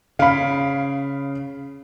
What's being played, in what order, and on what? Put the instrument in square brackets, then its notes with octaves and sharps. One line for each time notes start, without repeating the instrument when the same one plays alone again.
[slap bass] C#3 [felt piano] F5 B5